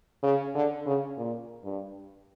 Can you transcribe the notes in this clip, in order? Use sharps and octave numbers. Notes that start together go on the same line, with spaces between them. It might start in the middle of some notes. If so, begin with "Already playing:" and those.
C#3
D3
C#3
A#2
G2